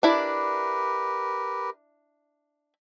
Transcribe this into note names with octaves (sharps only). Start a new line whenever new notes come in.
D4 E4 G4 A#4 B4 D5